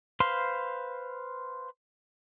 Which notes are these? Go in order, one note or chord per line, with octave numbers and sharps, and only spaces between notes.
B4 C5 F5 C6